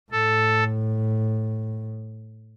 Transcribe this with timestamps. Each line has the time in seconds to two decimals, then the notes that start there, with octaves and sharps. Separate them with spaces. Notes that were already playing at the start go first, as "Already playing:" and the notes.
0.11 A2 A4